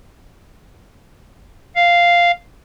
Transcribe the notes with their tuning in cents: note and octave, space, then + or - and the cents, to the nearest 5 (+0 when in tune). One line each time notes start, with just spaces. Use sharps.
F5 -5